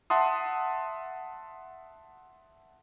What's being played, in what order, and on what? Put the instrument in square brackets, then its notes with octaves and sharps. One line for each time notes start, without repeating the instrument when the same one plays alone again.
[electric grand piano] E5 F#5 A5 C6 D#6